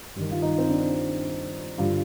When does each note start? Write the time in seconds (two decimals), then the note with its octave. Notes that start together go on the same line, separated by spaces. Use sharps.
0.16 G2 D#3
0.31 F4
0.42 D#4
0.58 C4
0.70 D4
1.78 G2 D3 F4